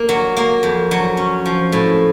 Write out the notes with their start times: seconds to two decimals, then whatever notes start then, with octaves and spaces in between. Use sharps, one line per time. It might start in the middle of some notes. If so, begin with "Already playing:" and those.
Already playing: A#3
0.09 F#3
0.37 A#3
0.63 F2
0.91 F#3
1.17 C#4
1.46 F3
1.72 A2